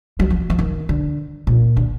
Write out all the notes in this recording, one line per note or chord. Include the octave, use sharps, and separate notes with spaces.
F#3
F3
F3
D#3
D3
A#2
D3